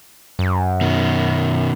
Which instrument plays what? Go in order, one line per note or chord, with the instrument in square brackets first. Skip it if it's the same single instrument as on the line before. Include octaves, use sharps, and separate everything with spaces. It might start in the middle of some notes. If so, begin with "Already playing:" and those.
[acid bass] F#2
[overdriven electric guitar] B2 D#3